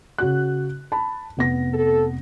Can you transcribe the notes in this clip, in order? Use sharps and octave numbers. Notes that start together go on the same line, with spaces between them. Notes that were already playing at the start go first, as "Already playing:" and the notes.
C#3 F#4 F#6
A5 B5
F1 B3 A#6
A4